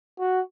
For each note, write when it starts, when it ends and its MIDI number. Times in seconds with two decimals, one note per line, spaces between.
0.19 0.40 66